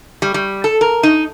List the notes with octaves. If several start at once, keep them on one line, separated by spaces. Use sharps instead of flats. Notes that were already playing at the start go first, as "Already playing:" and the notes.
G3
G3
A4
A#4
D#4